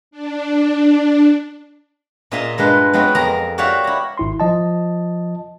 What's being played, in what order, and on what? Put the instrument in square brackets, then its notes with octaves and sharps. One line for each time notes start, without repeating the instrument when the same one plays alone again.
[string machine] D4
[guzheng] A#2 F4 G#4 D#5 E5 A#5
G2 G#3 F4 B4
F#3 G#3 B3 C4 F4 F#4
F2 G#4 A#4 A#5
F#4 G4 C#5 D5 E5 F5
E4 A#5
[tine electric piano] G#1 E4 C6
F3 D#5 A5